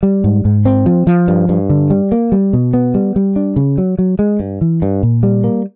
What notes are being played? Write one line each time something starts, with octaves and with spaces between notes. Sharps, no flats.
G3
G#2
G#2
C4
F3
F3
G2
G2
D3
G3
A#3
G3
B2
B3
G3
G3
D4
C#3
F#3
F#3
G#3
G2
E3
G2
A#2
G3
A#3